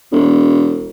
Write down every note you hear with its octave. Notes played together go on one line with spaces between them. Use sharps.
E1